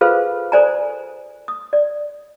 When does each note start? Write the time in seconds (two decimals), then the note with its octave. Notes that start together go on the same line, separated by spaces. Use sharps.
0.01 F4 G#4 A4 B4 C5 F5
0.52 A4 C5 D5 G#5 A#5
1.48 D#6
1.73 D5